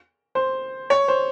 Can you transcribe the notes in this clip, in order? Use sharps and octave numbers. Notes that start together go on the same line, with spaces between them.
C5
C#5
C5